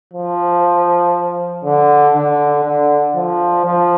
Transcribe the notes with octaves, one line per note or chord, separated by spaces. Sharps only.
F3
D3
D3
D3
F3
F3